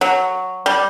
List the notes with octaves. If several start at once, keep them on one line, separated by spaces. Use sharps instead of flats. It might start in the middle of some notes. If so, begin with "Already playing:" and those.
F#3
G3